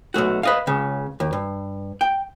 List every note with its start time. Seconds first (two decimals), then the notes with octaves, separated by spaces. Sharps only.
0.14 B1 F#2 A3 F#4
0.43 B4 D#5 F5
0.67 C#2 C#3
1.20 D#2
1.33 G2
2.01 G5